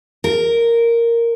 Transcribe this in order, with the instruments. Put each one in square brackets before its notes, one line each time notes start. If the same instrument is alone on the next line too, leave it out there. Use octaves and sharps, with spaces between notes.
[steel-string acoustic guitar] A#4